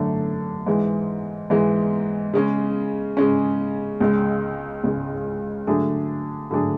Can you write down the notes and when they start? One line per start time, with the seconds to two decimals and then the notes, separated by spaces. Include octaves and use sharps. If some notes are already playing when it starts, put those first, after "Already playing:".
Already playing: F#2 D3 A3 D4
0.66 G#2 E3 G#3
1.50 G#2 E3 G#3
2.34 C#3 G#3 C#4
3.17 C#3 G#3 C#4
4.00 C#2 C#3 G#3
4.84 C#2 C#3 G#3
5.67 D3 F#3 A3 D4 G#4
6.51 D3 F#3 A3 D4 G#4